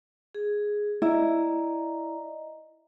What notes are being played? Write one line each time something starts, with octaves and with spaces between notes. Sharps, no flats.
G#4
E4 D5 D#5 A#5